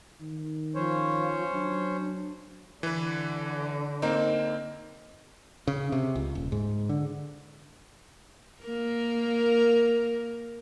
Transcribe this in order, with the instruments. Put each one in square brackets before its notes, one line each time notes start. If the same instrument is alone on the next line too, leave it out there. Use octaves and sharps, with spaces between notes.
[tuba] D#3
[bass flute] F3 [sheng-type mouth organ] C#4 C5 C#5
[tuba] F#3 [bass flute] D4
[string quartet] D3 [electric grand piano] E3 B4
[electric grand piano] A#3 C4 [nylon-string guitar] D#4
[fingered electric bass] C#3
C3
C#2
D#1
G#2
D3
[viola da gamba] A#3 A#4